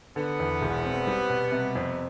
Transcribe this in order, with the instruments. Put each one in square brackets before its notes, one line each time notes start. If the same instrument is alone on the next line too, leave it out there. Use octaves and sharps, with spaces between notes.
[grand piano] D3 [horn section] B3
[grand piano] E2
E1
C4
G3
B2
C3
F2